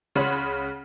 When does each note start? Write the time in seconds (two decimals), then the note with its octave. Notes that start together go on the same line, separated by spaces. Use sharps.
0.16 C#2 C#3 C#5 F#5 B5 C6